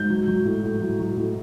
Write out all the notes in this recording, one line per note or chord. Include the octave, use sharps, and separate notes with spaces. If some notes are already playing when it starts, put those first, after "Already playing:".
Already playing: G#2 G6
F#3
F#3
A2
A2
F#3
F#3
A2